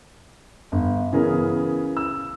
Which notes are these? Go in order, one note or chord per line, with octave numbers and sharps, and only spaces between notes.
G1
C#3 E3 B3 G#4 A#4
E6